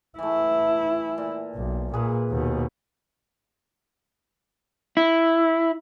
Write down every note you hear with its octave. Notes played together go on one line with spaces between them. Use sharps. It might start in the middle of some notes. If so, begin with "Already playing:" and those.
E3 A3 E4
A#2
B1
A#2 G#4 B4
D#2 B2
E4